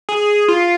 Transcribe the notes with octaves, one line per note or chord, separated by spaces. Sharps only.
G#4
F4